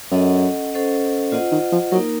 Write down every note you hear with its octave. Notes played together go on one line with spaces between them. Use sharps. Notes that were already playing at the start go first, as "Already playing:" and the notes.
F#2 C#4 A4 D#5 F#5
C#4 A4 C5 D#5 F#5
A#2 F4 C5 D#5 F#5
D#3
F3
F#3 A#3 D#4 A#4